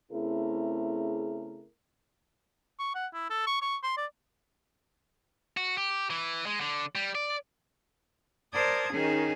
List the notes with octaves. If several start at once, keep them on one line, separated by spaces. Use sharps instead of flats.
C#3 A3 C4 E4 G#4 A#4
C#6
F#5
E4
A4
C#6
C#6
C6
D5
F#4
G4
E3
G#3
D3
G3
D5
A#4 C5 D5 A5 D#6 G#6
D#3 C#4 D#4 G#4